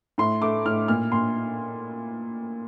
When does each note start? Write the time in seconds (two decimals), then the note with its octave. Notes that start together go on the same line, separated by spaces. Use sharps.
0.18 A2 C6
0.42 A3 D6
0.65 A2 F6
0.88 A#2 F6
1.12 A#2 C6